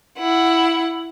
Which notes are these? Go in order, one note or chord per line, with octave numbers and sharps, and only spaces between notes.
E4 F#5